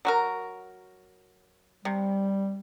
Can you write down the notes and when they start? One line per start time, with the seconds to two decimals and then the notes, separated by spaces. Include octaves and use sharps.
0.05 F#3 F#4 A#4
1.85 C3 G3